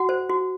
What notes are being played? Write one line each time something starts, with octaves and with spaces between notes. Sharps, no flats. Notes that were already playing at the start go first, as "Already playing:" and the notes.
Already playing: F#4 F#5
C5
F#4